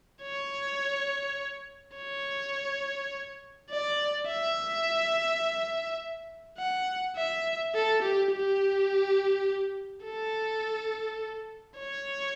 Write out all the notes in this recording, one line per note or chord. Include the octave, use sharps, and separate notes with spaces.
C#5
C#5
D5
E5
F#5
E5
A4
G4
G4
A4
C#5